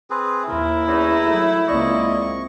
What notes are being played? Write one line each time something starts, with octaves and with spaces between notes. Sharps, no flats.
C4 G#4 B4
D#2 E4 A#4
E2 C#4 D#4
F#3 A3
C#2 A#3 C4 D5 D#5 C#6